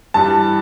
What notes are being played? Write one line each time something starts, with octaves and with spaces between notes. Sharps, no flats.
G2 E3 G3 A5